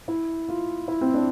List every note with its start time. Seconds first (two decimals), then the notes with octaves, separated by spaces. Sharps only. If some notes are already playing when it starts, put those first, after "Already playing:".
0.08 E4
0.48 F4
0.88 E4
1.01 C4
1.14 D4